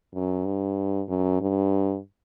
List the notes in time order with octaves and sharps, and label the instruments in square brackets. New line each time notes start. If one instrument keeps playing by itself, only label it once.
[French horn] F#2
G2
F#2
G2